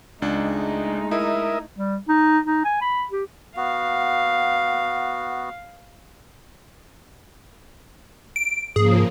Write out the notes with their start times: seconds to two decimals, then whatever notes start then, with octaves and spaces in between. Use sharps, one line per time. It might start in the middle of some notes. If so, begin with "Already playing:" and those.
0.22 C#2 G#3 A3 D4 D#4
1.11 E4 A#4 D#5 E5
1.77 G3
2.08 D#4
2.45 D#4
2.65 G#5
2.81 B5
3.11 G4
3.57 B3 F#4 F5
8.36 D7
8.76 G#2 C#3 F3 A#3 G#4